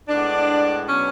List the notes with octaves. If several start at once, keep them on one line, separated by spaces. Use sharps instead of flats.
A2 G#3 B3 D4
B2 F#3 B3 C#4